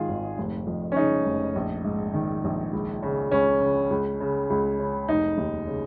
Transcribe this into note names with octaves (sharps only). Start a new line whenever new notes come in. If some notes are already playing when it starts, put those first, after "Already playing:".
Already playing: G#2 D#3 F4 G#4
G#1
F1
F2
C#4
C#3 D#4
F1
A#1
G#2
D#3
A#1
C#2
C#3
C#2 C#4
C#3
C#2
C#3
C#2
C#3
F1 D#4
D#2
C#3